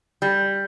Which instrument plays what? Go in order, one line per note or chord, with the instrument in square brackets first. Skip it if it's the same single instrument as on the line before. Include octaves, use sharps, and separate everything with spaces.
[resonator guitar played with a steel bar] G3